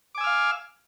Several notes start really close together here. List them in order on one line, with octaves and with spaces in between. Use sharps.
D6 G#5 E6 F6 F5